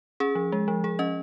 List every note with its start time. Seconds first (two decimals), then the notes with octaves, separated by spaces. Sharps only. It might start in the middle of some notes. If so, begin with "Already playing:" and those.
0.20 C#4 G#4
0.35 F3
0.52 G#3
0.68 F3
0.84 F3 G#4
0.99 C#4 D#5